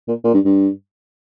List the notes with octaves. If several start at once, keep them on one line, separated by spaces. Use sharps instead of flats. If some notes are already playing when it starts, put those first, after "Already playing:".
A#2
A#2
G2
G2